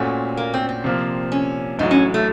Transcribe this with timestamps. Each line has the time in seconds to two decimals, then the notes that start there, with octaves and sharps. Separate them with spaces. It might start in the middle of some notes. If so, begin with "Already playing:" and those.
Already playing: A#2 A3 C4 C#4 F#4
0.37 A#3
0.54 C4
0.69 C4
0.84 C3 F3 A#3
1.32 C#4
1.79 A1 A2 F#3 D#4
1.91 C#4
2.14 A3